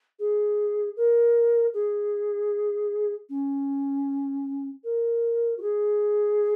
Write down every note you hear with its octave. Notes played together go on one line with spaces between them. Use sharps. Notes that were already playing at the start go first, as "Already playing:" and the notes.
G#4
A#4
G#4
C#4
A#4
F#4
G#4